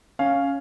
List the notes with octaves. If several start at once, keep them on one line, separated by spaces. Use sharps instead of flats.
C#4 F5